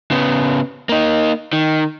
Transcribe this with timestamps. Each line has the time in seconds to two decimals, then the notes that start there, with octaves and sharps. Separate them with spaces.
0.11 C#3 B3
0.89 A#3 D#4
1.53 D#3